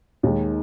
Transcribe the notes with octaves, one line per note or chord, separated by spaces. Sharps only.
D#2 D#3 G#3